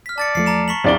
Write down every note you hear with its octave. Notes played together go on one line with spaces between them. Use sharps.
F6 B6
D5 A5 A6 C#7
E2 F3 A3 C7 C#7
A5 A#5 E7
C#6 B6 F#7
D1 C4 D4 D#4 D5 G7